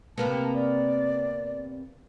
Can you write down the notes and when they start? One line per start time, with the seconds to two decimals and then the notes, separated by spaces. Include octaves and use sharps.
0.17 C3 A#3 B3 A5
0.54 D5